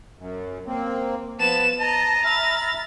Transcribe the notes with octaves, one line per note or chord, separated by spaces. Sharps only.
F#2
A#3 C4
F3 B3 A5 E7
D#5 A5 A#5
E5 B5 F6 A6